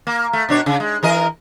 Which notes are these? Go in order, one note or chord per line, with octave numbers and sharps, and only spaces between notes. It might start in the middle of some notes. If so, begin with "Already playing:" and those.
A#3
A3
B2 D4 C#5
C#3
G#3
E3 A#4 D#5